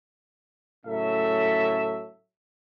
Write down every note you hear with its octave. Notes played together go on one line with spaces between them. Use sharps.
A2 C#3 F#3 A4 E5